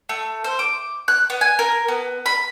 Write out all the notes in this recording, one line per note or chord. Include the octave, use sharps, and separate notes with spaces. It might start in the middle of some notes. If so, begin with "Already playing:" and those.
A3
C5
D6
F#6
B3
G#5
A#4
B3
B5